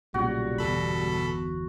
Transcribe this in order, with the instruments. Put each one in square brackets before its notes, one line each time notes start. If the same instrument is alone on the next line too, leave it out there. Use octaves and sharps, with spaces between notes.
[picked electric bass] B1 A#2 C#3 [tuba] G3 [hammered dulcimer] F#4
[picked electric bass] G1 E2 [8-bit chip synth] B2 A4 B5